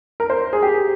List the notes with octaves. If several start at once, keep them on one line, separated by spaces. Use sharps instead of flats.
A#4
C5
G#4
G4